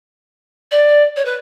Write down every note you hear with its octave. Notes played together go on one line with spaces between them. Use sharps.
D5
C#5
B4